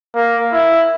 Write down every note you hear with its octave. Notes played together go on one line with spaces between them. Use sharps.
A#3
E4